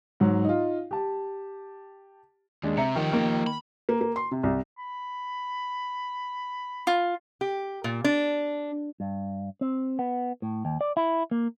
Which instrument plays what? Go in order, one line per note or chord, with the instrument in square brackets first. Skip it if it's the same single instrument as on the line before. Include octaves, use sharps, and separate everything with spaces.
[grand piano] G#2 F#3
D#4 F4
G4 A5
[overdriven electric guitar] D#2 [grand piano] G#3 D4
[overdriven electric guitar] C3 C4 [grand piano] E5 A#5 C#7
[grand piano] D#3 [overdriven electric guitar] F3 G4
[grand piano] D#3 A#3
[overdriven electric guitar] B5
[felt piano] A#3
A#3
C6
C3
C2
[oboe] B5
[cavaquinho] F4
[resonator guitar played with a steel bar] G4
A#2
D4
[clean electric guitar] G2
C4
B3
A2
D#2
D5
E4
A#3